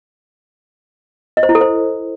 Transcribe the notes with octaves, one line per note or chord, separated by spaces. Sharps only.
D#5
C5
E4
A4
C5